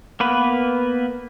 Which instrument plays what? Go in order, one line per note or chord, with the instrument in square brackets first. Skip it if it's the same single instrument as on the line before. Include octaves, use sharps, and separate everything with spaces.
[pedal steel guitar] A#3 B3 B4